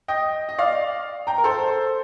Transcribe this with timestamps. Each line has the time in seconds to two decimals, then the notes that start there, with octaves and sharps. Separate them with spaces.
0.08 D#5 G5
0.49 D#5
0.59 D5 F5
1.27 G5 A#5
1.38 A#4
1.44 A4 C5